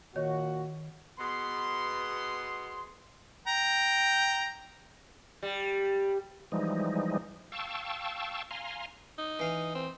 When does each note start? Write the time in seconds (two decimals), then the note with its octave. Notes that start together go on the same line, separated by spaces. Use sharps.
0.16 A#2 D#3 F#4 C#5 D#5
1.19 B2 B3 G#4 C6
3.47 G5 A#5
5.43 G3
6.52 E3 F3 G3 G#3 D#4
7.52 F5 G5 A5 C#6 E6
8.51 F5 G#5 A#5 C6
9.18 D#4
9.39 E3 F5
9.75 C4